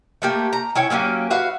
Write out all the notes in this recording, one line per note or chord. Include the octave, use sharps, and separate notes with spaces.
A3 A#3 G4
A#5
C#4 E4 C#5 G5
F#3 A#3 C#4 G4
F#4 B4 E5 F5